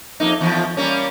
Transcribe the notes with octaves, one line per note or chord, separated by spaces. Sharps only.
F2 A#3 D#4
E2 F3
G3 A#3 C#4